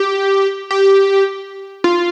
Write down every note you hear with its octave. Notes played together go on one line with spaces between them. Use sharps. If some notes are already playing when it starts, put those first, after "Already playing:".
Already playing: G4
G4
F4